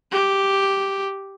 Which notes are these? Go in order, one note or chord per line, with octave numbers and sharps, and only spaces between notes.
G4